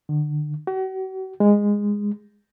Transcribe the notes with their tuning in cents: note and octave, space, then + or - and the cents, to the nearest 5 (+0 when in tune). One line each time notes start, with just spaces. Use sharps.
D3 +30
F#4 +40
G#3 -15